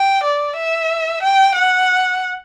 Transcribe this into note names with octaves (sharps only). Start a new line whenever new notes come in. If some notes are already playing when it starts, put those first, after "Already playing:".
Already playing: G5
D5
E5
G5
F#5